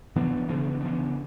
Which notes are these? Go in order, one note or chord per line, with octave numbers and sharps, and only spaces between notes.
C#3 E3 B3 D4
C#3 E3 B3 D4
C#3 E3 B3 D4